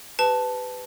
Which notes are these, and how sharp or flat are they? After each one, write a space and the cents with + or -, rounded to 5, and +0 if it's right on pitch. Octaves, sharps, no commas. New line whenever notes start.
G4 +0 B4 +20 A5 +0